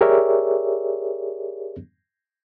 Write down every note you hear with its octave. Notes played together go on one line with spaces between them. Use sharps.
G4 G#4 A#4 C#5 D5 E5